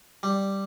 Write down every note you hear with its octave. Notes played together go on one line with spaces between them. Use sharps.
G3